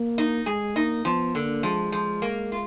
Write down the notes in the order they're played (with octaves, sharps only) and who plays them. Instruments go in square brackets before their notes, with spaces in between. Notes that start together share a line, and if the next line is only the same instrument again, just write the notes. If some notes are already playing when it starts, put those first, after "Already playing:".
Already playing: [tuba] A#3
[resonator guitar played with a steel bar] D#4
[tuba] G#3 [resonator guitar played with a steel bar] G#4
[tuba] A#3 [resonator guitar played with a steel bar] D#4
[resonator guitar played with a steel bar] F3 [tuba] B3
[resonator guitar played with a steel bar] D3 [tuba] A#3
[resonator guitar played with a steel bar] F3 [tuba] G#3
[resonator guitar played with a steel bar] F3
A#3
F4